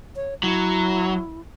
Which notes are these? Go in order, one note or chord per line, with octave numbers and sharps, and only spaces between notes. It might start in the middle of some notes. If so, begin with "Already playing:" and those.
C#5
F#3 E4